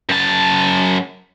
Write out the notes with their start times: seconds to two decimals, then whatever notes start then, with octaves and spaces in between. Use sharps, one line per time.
0.09 F#2 A5